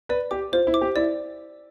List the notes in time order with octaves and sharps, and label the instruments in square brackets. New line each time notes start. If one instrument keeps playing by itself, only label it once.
[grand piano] B4 [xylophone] D5
[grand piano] G4 [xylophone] D6
[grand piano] F4 [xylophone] C5
[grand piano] E4
[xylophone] D6
[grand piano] G4
[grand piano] E4 [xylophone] D5